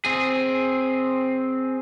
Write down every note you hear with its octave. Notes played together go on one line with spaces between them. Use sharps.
C4 G#4